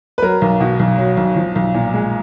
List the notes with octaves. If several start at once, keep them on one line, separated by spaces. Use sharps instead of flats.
B4
F#3 A#4
B1
B2
B1
F#3
B1
F3
B1
A#2
G#3